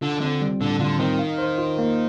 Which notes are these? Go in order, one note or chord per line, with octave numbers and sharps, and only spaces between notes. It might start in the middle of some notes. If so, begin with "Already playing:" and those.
D3 F4
D3 C4
G3
A2 D3
D3 F4
D#3 C4
F5
C5
F4
A#3